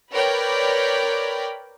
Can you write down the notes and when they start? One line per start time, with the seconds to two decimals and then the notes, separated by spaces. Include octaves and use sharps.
0.11 A#4 B4 C#5 D5 G5 B5